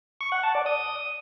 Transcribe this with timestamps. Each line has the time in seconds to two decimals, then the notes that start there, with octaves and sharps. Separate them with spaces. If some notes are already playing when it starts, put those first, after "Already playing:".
0.21 C#6
0.32 F#5
0.43 A5
0.55 D5
0.66 D#6